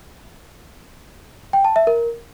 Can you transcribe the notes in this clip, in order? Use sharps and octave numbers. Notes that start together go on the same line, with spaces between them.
G5
A5
E5
A#4